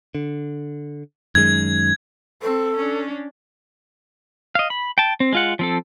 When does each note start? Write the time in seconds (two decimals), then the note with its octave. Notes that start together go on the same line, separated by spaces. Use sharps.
0.15 D3
1.35 F#2 D#3 G#3 G#6
2.42 C4 A4
2.76 C#4 D4
4.55 D#5 F5
4.70 B5
4.98 G5 A5
5.20 C4
5.33 G#3 F4 F#5
5.59 F3 C4 A4